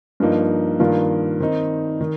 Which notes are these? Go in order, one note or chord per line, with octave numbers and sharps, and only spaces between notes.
G2 F3 A#3 D#4
G2 D#3 A#3 F4
D#3 C4 D#4
D#3